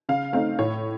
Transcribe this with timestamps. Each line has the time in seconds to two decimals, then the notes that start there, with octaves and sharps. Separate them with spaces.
0.09 C#3 F5
0.33 A3 C4 D#4 F5
0.59 A2 C#5